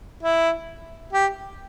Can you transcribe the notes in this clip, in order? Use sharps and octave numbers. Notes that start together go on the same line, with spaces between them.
E4
G4